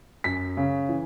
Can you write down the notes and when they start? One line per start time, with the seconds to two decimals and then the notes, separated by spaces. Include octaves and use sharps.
0.24 F#2 B6
0.57 C#3
0.89 E3